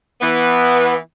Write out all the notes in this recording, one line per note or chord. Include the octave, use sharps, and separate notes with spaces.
E3 B3